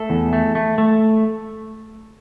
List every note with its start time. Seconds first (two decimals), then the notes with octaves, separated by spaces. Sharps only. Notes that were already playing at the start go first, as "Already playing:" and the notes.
Already playing: A3 A4
0.10 E2
0.33 A3
0.55 A3
0.78 A3